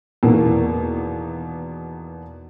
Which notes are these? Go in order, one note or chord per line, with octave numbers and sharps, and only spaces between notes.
E2 B2 D#3 A#3